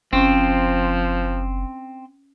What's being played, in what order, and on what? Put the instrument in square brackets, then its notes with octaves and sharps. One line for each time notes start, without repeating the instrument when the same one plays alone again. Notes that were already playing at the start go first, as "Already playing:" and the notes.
[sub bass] F#1 [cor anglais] F3 [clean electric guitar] C4 [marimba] C#4